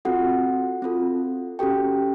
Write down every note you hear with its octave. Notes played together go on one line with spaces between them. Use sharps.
C4 F4 F#4 A4 F#5
C4 F4 A4
C#4 F#4 G4 A4 G5